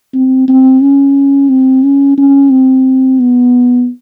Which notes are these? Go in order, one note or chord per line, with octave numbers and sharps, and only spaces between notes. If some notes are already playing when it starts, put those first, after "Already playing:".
C4
C4
C#4
C4
C#4
C#4
C4
B3